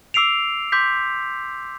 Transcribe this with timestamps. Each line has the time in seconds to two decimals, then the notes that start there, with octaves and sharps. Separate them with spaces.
0.14 D6 E6 C7 D7 F7
0.72 C6 D6 G6 B6